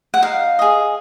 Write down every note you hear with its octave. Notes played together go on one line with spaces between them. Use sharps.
F#5
D#4 F5
G#4 D#5